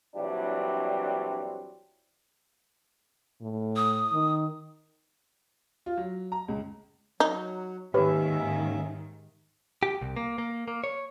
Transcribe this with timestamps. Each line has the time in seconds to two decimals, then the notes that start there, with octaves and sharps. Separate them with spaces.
0.16 A#1 E3 F#3 G3 C4 D4
3.42 A2
3.76 D#6
4.13 D#3
5.86 F4
5.97 F#3
6.32 A#5
6.48 C#2
7.20 F#3 D#4
7.94 D#2 G#2 D#3 C#4 G4 B4 C#5 E5
9.83 G4
10.02 C2
10.16 A#3
10.38 A#3
10.68 A#3
10.84 C#5